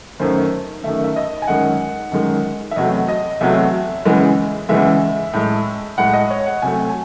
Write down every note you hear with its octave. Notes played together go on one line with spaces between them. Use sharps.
F#2 D#3 A3 C5
F#2 D#3 A3 E5
E5
D#5
G#5
F#2 D#3 G#3 F#5
F#2 D#3 G#3
E5
E2 C3 F#3 A3 D#5
D#5
E2 C3 F#3 A3 E5
E2 C#3 E3 G#3
E2 C#3 E3 G#3 E5
A2 G#3
A2 G#3 F#5
D#5
C#5
F#5
C3 F#3 A3 G#5
G#5